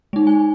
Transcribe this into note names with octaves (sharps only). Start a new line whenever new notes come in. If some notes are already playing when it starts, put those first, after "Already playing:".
G#3 D#4
G#5